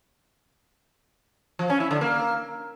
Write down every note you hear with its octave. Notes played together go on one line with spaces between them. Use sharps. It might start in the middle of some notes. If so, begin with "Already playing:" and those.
F3
C#4
E4
D3
A#3